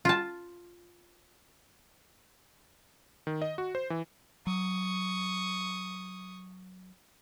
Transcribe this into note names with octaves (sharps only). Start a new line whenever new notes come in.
F4 A5
D#3
D#5
F#4
C5
E3
F#3 C#6 D#6